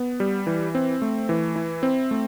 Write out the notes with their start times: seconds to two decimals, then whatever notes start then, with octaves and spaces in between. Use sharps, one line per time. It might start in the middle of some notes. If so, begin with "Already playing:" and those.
Already playing: B3
0.20 G3
0.47 E3
0.75 C4
1.02 A3
1.29 E3
1.56 E4
1.83 C4
2.11 A3